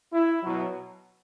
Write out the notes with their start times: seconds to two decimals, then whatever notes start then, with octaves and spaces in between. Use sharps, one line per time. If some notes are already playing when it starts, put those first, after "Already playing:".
0.13 E4
0.43 B2 F#3